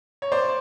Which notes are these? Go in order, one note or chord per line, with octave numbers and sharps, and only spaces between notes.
C#5
C5 D5